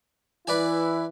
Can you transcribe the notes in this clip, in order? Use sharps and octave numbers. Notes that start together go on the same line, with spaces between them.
E3 E4 B4 D5 G#5